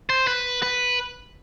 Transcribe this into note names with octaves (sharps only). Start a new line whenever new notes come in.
C5
B4
B4